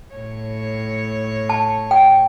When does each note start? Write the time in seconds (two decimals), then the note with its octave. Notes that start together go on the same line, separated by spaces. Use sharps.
0.14 A2 C#5
1.50 A5
1.91 G5